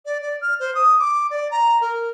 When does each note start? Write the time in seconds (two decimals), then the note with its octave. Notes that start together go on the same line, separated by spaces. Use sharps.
0.05 D5
0.22 D5
0.41 F6
0.60 C5
0.75 D#6
0.99 D6
1.31 D5
1.51 A#5
1.81 A#4